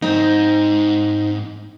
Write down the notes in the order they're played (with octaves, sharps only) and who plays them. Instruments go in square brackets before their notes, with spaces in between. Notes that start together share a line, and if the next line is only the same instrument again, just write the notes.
[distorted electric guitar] G#2 [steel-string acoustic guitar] C4 D#4